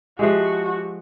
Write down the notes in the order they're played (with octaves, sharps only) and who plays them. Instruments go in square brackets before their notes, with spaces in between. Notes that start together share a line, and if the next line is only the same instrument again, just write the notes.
[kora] F3 G#3 [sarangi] F#4 [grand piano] G4 E5